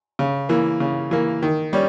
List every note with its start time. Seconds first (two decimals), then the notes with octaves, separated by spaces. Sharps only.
0.19 C#3
0.49 E3 A#3
0.80 C#3
1.11 E3 A#3
1.43 D#3
1.73 G3 C#4